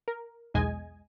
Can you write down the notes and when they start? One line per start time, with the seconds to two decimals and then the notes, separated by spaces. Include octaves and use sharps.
0.08 A#4
0.54 B1 E2 G#3 D#5 G#5